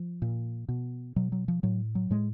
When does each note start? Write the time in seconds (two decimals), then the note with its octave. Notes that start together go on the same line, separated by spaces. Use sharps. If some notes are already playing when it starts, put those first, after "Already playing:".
Already playing: F3
0.22 A#2
0.69 B2
1.16 B2 F#3
1.32 F#3
1.48 F3
1.63 A2 F#3
1.95 F#3
2.10 A2 G#3